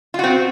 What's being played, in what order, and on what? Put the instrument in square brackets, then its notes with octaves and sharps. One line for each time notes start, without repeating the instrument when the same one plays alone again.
[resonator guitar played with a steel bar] F4
F#4
C4